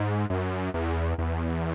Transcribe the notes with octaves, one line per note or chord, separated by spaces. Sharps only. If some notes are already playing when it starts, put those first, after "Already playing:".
Already playing: G#2
F#2
E2
E2